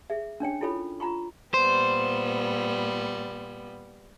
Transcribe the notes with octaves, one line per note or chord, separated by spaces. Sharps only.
G#4 E5
C#4 D4 C#5 G5
E4 F4 A4 C#5 B5
F4 A#5 B5 C#6
A#2 G3 B3 C5